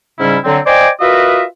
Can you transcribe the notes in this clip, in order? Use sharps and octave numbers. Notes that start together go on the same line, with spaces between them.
G#2 C#3 G3 C#4 E4
D3 F#3 C4
C5 D5 D#5 G5 G#5 D6
F4 F#4 A#4 B4 D#5 E5